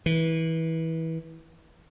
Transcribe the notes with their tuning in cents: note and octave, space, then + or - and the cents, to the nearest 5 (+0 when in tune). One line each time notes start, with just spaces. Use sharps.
E3 -25